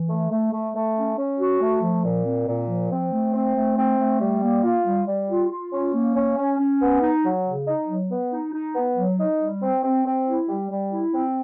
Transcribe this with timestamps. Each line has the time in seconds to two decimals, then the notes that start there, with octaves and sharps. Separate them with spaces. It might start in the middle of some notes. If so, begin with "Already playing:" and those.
Already playing: E3
0.09 A3
0.30 A3
0.52 A3
0.74 A3
0.95 C#4
1.17 C#4
1.39 F#4
1.60 A3
1.82 F3
2.04 A#2
2.25 C4
2.47 A#2
2.68 F3
2.90 C4
3.12 A3
3.34 C4
3.55 A3
3.77 C4
3.98 A3
4.20 G3
4.42 A#3
4.63 F4
4.85 G3
5.07 G3
5.28 F4
5.50 F4
5.72 C#4
5.93 A#3
6.15 C#4
6.37 C#4
6.59 C#4
6.80 B3
7.01 D#4
7.23 F#3
7.45 C#3
7.66 D#4
7.88 F#3
8.09 B3
8.31 D#4
8.53 D#4
8.75 B3
8.96 F#3
9.18 D#4
9.40 G3
9.62 C4
9.83 C4
10.05 C4
10.27 E4
10.48 G3
10.70 G3
10.91 E4
11.13 C4